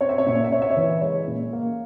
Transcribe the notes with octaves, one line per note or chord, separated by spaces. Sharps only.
C4 C#5
E5
C#5
A#2 E5
C#5
E5
C4 C#5
E5
C#5
E3
G#3 C#5
A#2
A#3